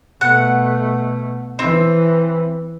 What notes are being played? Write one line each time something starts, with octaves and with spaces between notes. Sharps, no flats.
B2 A3 F#5
E3 C4